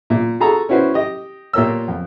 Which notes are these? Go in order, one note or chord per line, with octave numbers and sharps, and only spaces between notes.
A#2
F4 F#4 G#4 A4 A#5
C#4 E4 F#4 B4 C5
G4 D#5
A#2 F4 G4 A#4 C#5 E6
F2